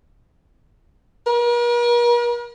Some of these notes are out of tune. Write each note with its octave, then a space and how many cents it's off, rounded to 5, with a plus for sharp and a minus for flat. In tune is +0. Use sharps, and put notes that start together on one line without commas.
A#4 +45